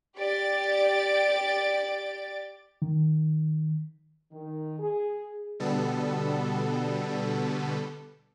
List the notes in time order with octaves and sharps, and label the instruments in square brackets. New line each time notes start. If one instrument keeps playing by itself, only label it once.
[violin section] G4 D5 A6 D7
[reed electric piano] D#3
[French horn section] D#3
G#4
[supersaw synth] B2 D3 G3 B3 A4